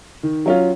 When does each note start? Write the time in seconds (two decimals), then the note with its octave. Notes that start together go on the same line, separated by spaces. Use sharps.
0.23 D#3
0.46 F#3 C#4 F4